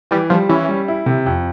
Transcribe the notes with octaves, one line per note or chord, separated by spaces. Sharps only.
E3 G3
F3 G3
E3 C#4
G3
E4
C3
F2